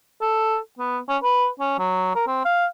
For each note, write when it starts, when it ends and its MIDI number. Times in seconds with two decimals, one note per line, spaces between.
0.21 0.57 69
0.79 0.99 59
1.08 1.17 61
1.23 1.48 71
1.59 1.75 61
1.79 2.10 54
2.15 2.23 70
2.27 2.40 60
2.45 2.66 77